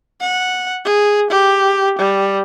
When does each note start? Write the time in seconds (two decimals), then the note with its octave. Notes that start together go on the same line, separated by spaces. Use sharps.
0.21 F#5
0.85 G#4
1.30 G4
1.99 G3